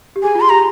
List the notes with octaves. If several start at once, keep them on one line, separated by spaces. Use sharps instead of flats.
G4
G#4 G#5
F4
C6
G4 A#5